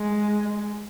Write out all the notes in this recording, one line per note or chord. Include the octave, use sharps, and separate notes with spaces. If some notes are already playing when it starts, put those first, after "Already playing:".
Already playing: G#3